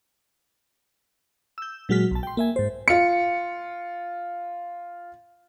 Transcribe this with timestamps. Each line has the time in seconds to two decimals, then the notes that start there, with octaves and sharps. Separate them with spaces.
1.58 E6 G6
1.89 A#2 F#3 G#3 F#4 F6 B6
2.11 B1 A5
2.23 G5 C6
2.37 A#3 E5 G#5
2.56 G#2 C5
2.88 F4 C#7